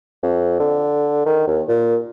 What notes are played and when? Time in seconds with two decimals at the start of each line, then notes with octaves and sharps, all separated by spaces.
0.23 F2
0.60 D3
1.26 D#3
1.47 D#2
1.68 A#2